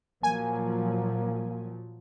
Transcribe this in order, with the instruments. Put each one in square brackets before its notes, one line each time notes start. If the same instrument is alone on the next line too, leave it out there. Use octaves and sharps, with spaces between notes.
[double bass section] A#2 F3 F#3 [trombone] A#3 [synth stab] G#5